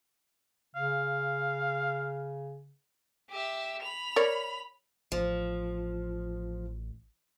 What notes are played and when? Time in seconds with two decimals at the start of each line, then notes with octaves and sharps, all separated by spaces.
0.76 C#3 F5
3.30 G4 E5
3.82 B5 F7
4.16 A#4 C#5 D5
5.12 A1 F3